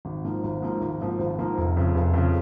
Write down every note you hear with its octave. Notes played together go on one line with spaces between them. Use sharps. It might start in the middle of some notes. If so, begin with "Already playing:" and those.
G#1
G#2 F3 A#3
G#1
G#2 F3 A#3
G#1
G#2 F3 A#3
G#1
G#2 F3 A#3
F1
F2 C#3
F1
F2 C#3